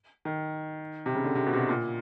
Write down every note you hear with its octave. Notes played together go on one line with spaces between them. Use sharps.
D#3
C3
C#3
D3
C3
B2
C3
B2
A#2